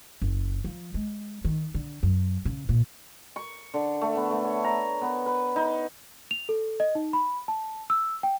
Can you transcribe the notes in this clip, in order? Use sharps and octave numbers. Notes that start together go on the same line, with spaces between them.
F#1
F3
G#3
D#3
D3
F#2
C#3
A#2
C#6
D3
A3
B3
A3
C#5
A#5
B3
B4
D#4
F7
A4
D#5
D#4
B5
A5
E6
G5